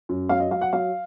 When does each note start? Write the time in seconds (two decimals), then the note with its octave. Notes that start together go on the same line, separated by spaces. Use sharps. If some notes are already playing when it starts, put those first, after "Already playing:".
0.09 F#2
0.29 F#3 F5
0.40 D#5
0.51 F#3 F5
0.61 F#5
0.73 F#3 F5